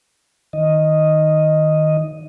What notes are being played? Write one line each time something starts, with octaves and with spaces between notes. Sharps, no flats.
D#3 D#5